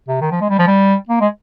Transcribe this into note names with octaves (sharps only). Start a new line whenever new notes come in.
C3
D#3
F3
G#3
G3
F3
G3
A#3
G#3